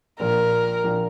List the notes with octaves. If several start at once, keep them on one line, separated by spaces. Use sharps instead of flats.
A#1 A#2 A#4
A#1 A#2